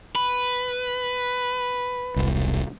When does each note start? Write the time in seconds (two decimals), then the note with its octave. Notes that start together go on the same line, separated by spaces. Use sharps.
0.15 B4
2.16 E1 C2